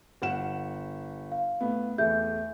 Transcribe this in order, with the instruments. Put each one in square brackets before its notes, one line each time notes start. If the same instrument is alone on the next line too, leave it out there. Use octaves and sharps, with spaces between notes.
[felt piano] G1 F#5 E7
[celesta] F5
[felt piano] A2 B3
[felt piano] E2 A3 [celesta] E5 G6